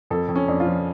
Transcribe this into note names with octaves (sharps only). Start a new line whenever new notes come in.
F2 A4
F2
C#4
F2 D4
F4
F3